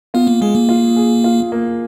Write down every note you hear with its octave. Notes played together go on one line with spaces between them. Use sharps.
B3 F4
A#3
G#3 G#4
A#3
F4
G#4
F4
A#3